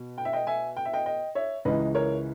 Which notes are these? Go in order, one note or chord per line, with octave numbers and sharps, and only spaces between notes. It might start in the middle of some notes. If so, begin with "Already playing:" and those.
Already playing: B2
G5
E5
D#5 G5
E5 G#5
G5
E5
D#5 G5
D#5 G5
C#5 E5
C#2 C#3 E3 B4 D#5
A#4 C#5